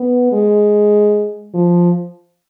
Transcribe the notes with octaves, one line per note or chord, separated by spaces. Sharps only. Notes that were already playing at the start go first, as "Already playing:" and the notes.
Already playing: B3
G#3
F3